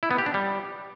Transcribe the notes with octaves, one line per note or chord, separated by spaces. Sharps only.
E4
B3
G4
D4
G3